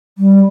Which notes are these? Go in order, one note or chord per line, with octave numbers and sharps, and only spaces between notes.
G3